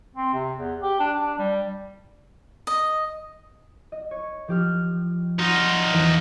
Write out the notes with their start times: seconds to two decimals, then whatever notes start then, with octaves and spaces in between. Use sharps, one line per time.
0.15 C4
0.34 C3
0.58 E2
0.82 G4
1.00 D4
1.20 D4
1.39 G3
2.67 D#5
3.92 D#5
4.11 C#5
4.48 F3 G4 F6
5.39 D#4 F4 F#4
5.93 E2 E3